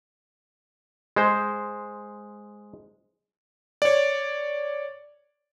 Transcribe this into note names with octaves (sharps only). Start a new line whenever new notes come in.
G#3 C5
C#5 D5